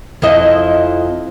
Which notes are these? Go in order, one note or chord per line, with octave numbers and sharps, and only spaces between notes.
F2 E4 D#5